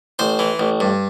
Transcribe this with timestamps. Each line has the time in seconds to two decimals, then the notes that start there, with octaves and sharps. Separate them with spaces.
0.19 A1 C5
0.39 E3
0.59 A1
0.80 G2